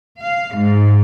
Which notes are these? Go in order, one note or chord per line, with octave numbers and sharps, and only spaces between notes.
F5
G#2